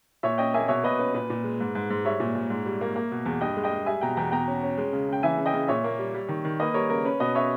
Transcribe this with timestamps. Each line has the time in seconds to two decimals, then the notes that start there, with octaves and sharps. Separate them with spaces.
0.23 A#2 C#5 E5
0.38 C#4 D#5 G5
0.54 A#3 E5 G#5
0.68 B2 C#5 E5
0.84 B2 B4 D#5
0.99 C#4 B4
1.14 A#2 B4
1.30 A#2
1.44 G#3
1.60 G#2
1.75 G#2
1.90 G#2
2.04 G3 C#5 E5
2.20 A#2
2.35 A#2
2.50 G#2
2.66 G3
2.81 A#3
2.96 A#3
3.12 B2
3.26 E2
3.41 G2 D#5 G5
3.57 G#3
3.64 D#5 G5
3.72 G#3
3.86 G3 E5 G#5
4.01 B2 G5 A#5
4.17 E2 G5 A#5
4.32 B2 G5 A#5
4.48 C#4
4.63 C#4
4.78 G#3
4.93 C#3
5.09 C#3 G5
5.23 E3 E5 G#5
5.38 C#3
5.46 D#5 G5
5.54 C#3
5.68 A#2 C#5 E5
5.84 A#3
5.99 G3
6.15 G3
6.29 D#3
6.45 D#3
6.60 A#3 B4 D#5
6.74 G3 A#4 C#5
6.90 C#3 A#4
7.05 C#4 B4
7.20 B2 B4 D#5
7.35 C#4 C#5 E5